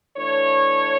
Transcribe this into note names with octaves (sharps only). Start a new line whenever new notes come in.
E3 A3 D4 C#5